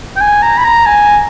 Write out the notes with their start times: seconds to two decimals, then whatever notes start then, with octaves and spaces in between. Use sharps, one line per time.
0.16 G5
0.21 G#5
0.42 A#5
0.58 B5
0.65 A#5
0.86 G#5